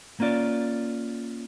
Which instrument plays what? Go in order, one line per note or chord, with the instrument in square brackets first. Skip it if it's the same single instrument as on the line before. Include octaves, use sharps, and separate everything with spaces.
[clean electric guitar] A#3 C#4 F4 D5